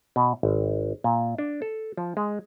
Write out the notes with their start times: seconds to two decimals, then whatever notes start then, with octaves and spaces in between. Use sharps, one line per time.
0.16 B2
0.43 G#1
1.04 A#2
1.38 D4
1.62 A4
1.97 F3
2.17 G#3